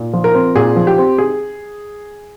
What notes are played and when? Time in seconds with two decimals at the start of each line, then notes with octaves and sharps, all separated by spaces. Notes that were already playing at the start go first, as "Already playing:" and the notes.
Already playing: A#2
0.13 F3
0.24 A#4
0.35 C4
0.56 A#2 G#4
0.76 F3
0.87 G4
0.98 C4
1.18 G#4